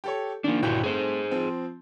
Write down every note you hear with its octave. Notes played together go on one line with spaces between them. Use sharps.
G4 A4 C#5
D#3 A#3 D4
G1 A#2 E4 F#4 G5 G6
A3 C4 G#4 C5
F3 C4